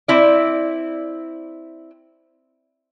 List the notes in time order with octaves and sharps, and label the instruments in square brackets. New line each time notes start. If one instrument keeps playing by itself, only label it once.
[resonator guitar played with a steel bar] C4 E4 D5